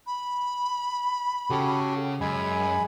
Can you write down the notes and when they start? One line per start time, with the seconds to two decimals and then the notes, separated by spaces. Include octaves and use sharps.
0.06 B5
1.50 C#3 C#4 F#4 G4 A4
2.21 F#2 G#3 G#5 B5